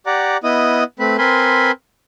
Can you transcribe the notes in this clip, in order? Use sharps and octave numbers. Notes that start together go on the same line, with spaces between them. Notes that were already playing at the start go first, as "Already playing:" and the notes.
G4 D5 F#5 A#5
B3 E4 D#5 D#6
A3 C4 B4 B5
C4 A#4 B4 G#5 B5 C6